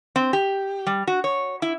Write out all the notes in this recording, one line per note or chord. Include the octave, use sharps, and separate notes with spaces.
C4
G4
G3
F#4
C#5
E4